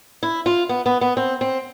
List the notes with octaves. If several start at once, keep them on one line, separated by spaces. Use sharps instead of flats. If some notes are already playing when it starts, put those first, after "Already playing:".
E4
F4
B3
B3
B3
C4
C4